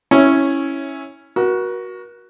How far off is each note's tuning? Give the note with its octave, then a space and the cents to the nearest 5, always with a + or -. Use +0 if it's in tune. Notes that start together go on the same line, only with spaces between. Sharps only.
C#4 -10 E4 -10 C#5 +0
F#4 +0 A#4 +40